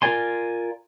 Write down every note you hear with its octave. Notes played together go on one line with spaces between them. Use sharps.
F4 A#4 D5 G#5 C6